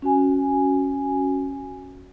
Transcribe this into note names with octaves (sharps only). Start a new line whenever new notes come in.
C#4 F#4 G#5